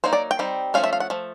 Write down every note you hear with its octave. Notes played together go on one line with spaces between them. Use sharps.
F#3 A#3 D#4 C5
D5
G5
G3 C4 D#4
F3 A3 C#4 F5
E5
F5
F#5
F3 A3